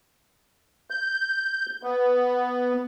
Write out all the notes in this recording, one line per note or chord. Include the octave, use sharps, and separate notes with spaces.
G6
B3